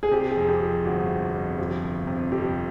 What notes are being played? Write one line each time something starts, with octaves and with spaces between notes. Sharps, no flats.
G#4
C3 G4
G#4
F2
G4
F3
G1 F#4
C3
F2
F3 G4
G1
C3
F2 G4